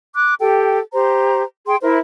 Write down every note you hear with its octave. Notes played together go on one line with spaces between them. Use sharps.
D6 F#6
G4 A4 G5
G4 C5 A#5
G#4 G5 C6
E4 A#4 C5 E5